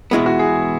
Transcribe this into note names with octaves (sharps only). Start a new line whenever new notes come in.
E2 B2 G#3 B3 E4
F#4
G#4